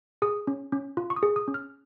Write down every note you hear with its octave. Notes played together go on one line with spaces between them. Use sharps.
G#4 D#6
C#4
C#4
F4
C#6
D#6
G#4
D#6
C#4
F6